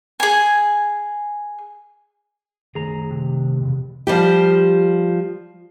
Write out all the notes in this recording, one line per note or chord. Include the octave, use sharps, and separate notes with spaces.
G#4 G#5
D#3 A3 G#4 A#5
C3
B2 E3
F3 G3 G4